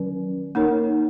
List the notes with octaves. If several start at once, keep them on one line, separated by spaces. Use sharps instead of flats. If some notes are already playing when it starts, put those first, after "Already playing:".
Already playing: D#3 F#3 C#4
A#3 D#4 A#4 C#5